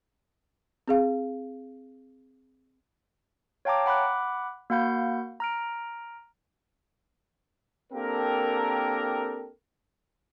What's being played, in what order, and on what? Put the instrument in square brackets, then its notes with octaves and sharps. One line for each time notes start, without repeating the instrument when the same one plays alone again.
[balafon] C4 G#4 F5
[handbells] C#5 F5 G5 A5 A#5 D6
F#5 B5 D6 F#6
A#3 F#4 F5 F#5 B5 G6
A#5 F6 D7
[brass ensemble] A#3 C4 D4 G4 A4 A#4